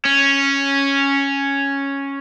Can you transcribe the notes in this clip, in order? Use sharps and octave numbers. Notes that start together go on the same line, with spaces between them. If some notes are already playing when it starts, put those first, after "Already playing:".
C#4